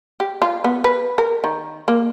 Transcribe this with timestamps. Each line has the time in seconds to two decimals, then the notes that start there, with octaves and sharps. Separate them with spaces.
0.20 G4
0.42 F4
0.64 B3
0.84 B4
1.18 A#4
1.44 D#3
1.88 A#3